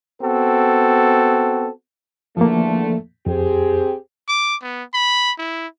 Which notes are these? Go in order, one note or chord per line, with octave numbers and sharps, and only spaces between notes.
B3 C4 F#4 A4
E2 D3 F3 A3 A#3
F2 C4 G4 G#4
D6
B3
B5
E4